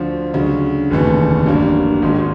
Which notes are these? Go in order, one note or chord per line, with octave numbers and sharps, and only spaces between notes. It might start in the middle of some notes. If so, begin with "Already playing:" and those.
Already playing: D2 D3 F3
D2 C#3 F#3
F1 D#2 C#3 E3 A3
A1 G2 D3 F#3 A#3
G#1 G#2 D#3 G#3